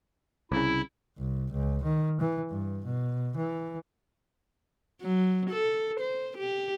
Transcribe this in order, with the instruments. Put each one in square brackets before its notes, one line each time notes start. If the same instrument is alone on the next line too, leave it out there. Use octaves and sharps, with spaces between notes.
[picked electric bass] C2 C#3 [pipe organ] E4
[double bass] C2
C#2
D#3
E3
G2
B2
E3
[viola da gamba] F#3
A4
C5
G4